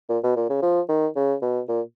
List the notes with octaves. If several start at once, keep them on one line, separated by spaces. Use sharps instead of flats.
A#2
B2
A#2
C#3
F3
D#3
C#3
B2
A#2